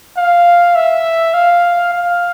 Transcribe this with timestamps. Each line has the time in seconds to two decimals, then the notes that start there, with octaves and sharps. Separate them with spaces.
0.17 F5
0.76 E5
1.34 F5
1.93 F5